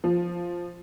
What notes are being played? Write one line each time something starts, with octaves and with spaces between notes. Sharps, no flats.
F3